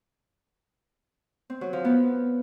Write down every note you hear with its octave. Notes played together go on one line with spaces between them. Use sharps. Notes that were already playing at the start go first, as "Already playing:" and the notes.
C4
F#3
F3
B3